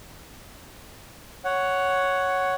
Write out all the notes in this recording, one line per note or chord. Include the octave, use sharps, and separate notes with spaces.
C#5 F#5